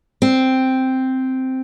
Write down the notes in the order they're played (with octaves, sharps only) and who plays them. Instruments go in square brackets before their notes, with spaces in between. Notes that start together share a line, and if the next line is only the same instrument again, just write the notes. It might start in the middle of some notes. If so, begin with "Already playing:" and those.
[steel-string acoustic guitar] C4